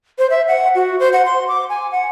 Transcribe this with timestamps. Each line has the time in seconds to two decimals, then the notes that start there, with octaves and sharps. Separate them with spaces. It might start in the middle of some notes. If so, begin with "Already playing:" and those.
0.18 C5
0.30 E5
0.48 F#5
0.75 F#4
1.00 C5
1.13 F#5
1.25 C6
1.48 D6
1.69 G#5
1.91 F#5